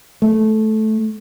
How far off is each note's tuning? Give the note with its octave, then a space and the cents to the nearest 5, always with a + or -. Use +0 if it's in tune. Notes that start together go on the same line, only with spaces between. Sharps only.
A3 -15